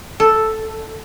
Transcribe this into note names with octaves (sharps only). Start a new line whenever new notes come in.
A4